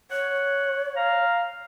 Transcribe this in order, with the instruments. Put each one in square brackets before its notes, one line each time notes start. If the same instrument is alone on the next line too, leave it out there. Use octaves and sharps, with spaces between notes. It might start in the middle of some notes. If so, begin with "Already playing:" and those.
[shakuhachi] C#5 [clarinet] F#5
[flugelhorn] F5 [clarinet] A#5